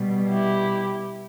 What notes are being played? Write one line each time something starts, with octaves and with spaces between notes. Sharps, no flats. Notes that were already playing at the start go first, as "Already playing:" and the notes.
Already playing: B2 G3
E4 G4